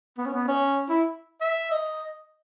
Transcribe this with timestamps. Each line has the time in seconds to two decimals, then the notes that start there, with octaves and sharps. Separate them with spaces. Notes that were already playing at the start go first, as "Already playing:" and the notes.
0.18 B3
0.26 C#4
0.34 B3
0.48 C#4
0.89 E4
1.41 E5
1.71 D#5